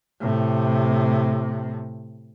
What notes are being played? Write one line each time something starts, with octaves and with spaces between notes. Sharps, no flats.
A2 C3